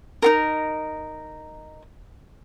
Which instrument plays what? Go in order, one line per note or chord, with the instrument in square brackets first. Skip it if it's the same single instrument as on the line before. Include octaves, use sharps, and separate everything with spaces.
[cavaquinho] D#4 F4 A#4